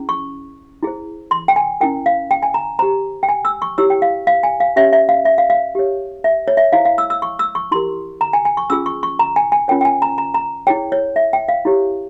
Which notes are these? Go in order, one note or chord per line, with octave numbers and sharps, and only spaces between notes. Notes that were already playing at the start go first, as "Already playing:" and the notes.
Already playing: C#4 E4 G#4
C#6
E4 G#4 C5
C6
G5
G#5
C#4 E4 A#4 G5
F5
G5
G#5
A#5
G4 C5 A#5
G5
G#5
E6
C#6
E4 G4 C#5 E6
G5
F5
F5
G#5
F5
C#4 G4 C#5 E5
E5
F5
E5
F5
F5
G4 C#5
E5
C#5
E5
E4 G#4 C5 F5
F5
E6
E6
C#6
E6
C#6
E4 G4 A#4 C6
A#5
G#5
G#5
C#6
C#4 F4 G#4 E6
C#6
C#6
A#5
G#5
G#5
C#4 F4 A#4 C#5 G5
G5
G#5
A#5
A#5
A#5
E4 G#4 C#5 G5
C#5
E5
G5
F5
E4 G4 C#5